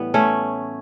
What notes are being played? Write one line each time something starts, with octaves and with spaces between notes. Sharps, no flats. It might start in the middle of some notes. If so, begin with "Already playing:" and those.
Already playing: A2 E3 G3 B3
A3 C#4